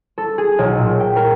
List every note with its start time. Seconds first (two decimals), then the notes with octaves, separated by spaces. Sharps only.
0.18 A4
0.38 G#4
0.59 B1
0.78 A#2
1.00 G5
1.16 A#4